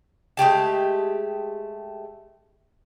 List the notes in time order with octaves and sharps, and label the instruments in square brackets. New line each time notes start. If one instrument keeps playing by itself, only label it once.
[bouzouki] G#3 A3 G4 A5